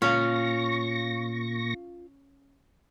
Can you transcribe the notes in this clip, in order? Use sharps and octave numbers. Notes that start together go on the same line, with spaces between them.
A#2 C#4 F4 C#5 F5 C#6 A#6